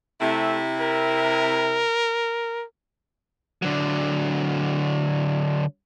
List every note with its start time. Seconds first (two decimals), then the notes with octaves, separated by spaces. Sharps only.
0.21 C3 A3 E4
0.81 A#4
3.62 D3 F#3